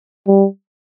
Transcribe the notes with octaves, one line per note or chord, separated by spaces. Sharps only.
G3